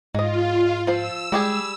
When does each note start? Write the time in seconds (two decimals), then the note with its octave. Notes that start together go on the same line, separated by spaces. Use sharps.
0.15 G#2 G#3 F4 D#5
0.87 F3 C5 E6
1.32 G3 G#3 G4 G#4